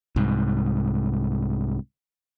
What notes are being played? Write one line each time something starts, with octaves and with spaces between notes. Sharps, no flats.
C2 G#2